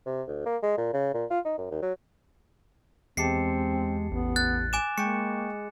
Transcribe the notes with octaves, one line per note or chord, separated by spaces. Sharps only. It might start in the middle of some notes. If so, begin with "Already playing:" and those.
C3
D2
A#3
G#3
A#2
C#3
A#2
F4
D#4
F#2
D#2
F#3
E2 G#3 C4 G4 A5 C7 C#7
A1 B3
F#6 A6
G#5 D6 E7
G#3 A#3 G5 C#6 C#7